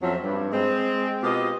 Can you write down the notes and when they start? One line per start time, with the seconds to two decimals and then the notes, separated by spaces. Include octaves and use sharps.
0.02 F2 F3 F#3 C#4 C5 E5
0.22 G2
0.52 G#3 C4
1.23 B2 F4 G4 D#5